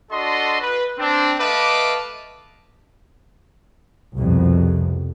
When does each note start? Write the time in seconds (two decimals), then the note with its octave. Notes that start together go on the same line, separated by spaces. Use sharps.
0.11 D4 F#4 A4 D#5 C6
0.61 B4
0.99 C4 D4
1.40 A3 B4 D#5 F5 A5 D6
4.15 C2 F2 B2